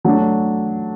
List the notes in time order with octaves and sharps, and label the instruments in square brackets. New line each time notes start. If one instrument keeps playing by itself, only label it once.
[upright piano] F#3 A3 D4